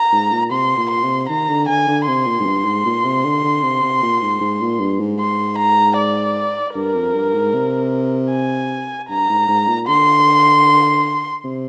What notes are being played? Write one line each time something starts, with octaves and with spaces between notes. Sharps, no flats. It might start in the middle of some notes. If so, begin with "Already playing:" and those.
Already playing: A#5
G#2
A#2
C3 C6
A#2
C6
C3
D#3 A#5
D3
D3 G#5
D3
C3 C6
A#2
G#2
G2
G#2
A#2
C3
D3
D3
C3
C3
A#2
G#2
G#2
A#2
G2
G#2
C6
A#5
D5
G2 A#4
F2
G2
G#2
C3
G#5
G2 A#5
G#2
G#2
A#2
D3 C6
C3